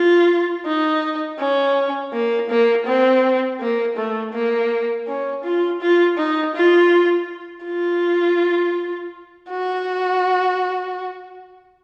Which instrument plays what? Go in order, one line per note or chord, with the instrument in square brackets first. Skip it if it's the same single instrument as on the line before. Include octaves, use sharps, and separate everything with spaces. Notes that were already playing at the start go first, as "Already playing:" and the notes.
Already playing: [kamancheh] F4
D#4
C#4
A#3
A#3
C4
A#3
A3
A#3
C#4
F4
F4
D#4
F4
F4
F#4